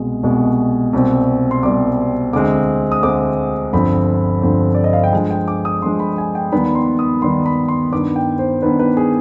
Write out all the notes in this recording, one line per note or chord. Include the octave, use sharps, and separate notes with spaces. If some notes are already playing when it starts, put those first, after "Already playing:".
Already playing: C2 B2 G#3
C2 B2 G#3
C2 B2 G3 C4
C6
C2 B2 G3 C4 D6
D2 D3 G#3 C4 D6
D#6
D2 D3 G#3 C4 D6
G1 G2 F3 C4 B5
G1 G2 F3 C4
D5
D#5
F5
G5
G2 F3 G#3 G#5
G5
D6
D#6
G2 F3 G#3 C6
B5
G#5
G5
D#2 D#3 G3 B3 B5
C6
D#6
D#2 D#3 G3 B3 C6
B5
C6
G2 D#3 B3 D6
G5
C5
G2 D#3 B3 B4
B4
G#4